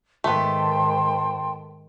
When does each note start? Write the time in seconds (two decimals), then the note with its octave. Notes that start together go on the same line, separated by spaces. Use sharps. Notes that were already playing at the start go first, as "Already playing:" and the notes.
0.24 G#2 D#3 A3 B3 G5 A5 C6